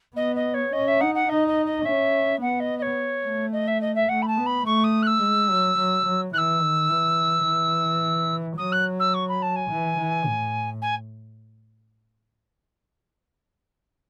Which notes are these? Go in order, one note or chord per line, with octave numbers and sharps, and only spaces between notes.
B3 D#5
D#5
C#5
C#4 D#5
E5
D#4 F#5
F#5
D#4 D#5
D#5
D#5
C#4 E5
B3 F#5
D#5
D#5
C#5
A3
D#5
E5
D#5
E5
A3 F#5
B5
A5
B3
B5
A3 C#6
D#6
F#6
E6
G#3
F#3
F#3
F#3
E3 E6 F#6
D#3
E3
E3
F#3 D#6
F#6
E6
C#6
B5
A5
G#5
E3
E3
A2
G#5